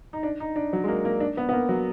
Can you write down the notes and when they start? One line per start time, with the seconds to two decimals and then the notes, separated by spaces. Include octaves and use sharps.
0.13 D#4
0.23 D4
0.40 D#4
0.56 D4
0.73 F#3
0.84 G#3
0.88 A#3
1.05 A#3
1.20 D4
1.37 B3
1.49 B3
1.53 A#3
1.69 F#3